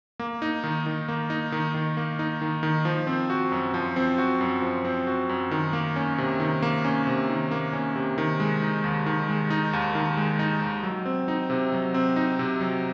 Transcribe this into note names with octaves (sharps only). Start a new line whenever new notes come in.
A#3
D#4
D#3
D#3
A#3
D#4
D#3
D#3
A#3
D#4
D#3
D#3
F3
C4
F#4
F#2
F3
C4
F#4
F#2
F3
C4
F#4
F#2
D#3
A#3
C#4
C3
D#3
A#3
C#4
C3
D#3
A#3
C#4
C3
D#3
G#3
D#4
D#2
D#3
G#3
D#4
D#2
D#3
G#3
D#4
D#2
F#3
C4
D#4
C3
F#3
C4
D#4
C3
F#3